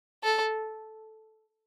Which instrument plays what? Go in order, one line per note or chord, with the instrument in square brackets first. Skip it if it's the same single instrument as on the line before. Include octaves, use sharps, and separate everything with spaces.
[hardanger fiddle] A4